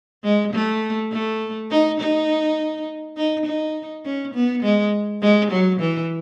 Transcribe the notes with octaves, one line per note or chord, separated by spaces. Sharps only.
G#3
A3
A3
D#4
D#4
D#4
D#4
C#4
B3
G#3
G#3
F#3
E3